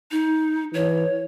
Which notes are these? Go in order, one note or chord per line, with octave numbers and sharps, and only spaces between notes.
D#4
E3 C#5